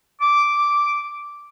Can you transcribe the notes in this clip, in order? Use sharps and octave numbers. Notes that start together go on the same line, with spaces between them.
D6